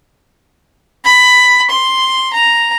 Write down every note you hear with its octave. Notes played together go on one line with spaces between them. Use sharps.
B5
C6
A#5